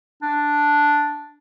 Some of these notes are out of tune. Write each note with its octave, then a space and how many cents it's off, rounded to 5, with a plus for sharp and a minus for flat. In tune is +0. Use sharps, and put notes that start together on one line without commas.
D4 +0